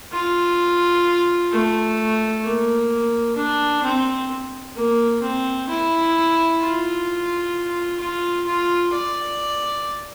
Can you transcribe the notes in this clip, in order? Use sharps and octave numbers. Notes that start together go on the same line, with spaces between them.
F4
A3
A#3
D4
C4
A#3
C4
E4
F4
F4
F4
D5